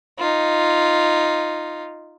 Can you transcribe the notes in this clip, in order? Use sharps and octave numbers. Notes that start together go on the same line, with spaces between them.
D#4 F4